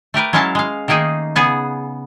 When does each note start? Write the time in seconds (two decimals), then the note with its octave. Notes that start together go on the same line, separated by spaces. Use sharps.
0.14 A3 G4 A#4 B4
0.33 F#3 G#3 C#4 E4 F5 A5
0.55 G#3 F5
0.88 D#3 A3 A#3 D#4 G#4
1.36 C#3 B3 G#4